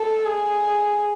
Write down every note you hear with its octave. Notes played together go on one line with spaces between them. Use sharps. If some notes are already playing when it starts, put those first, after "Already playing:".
Already playing: A4
G#4